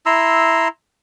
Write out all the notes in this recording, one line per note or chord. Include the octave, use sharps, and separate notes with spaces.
E4 A#5 C6 E6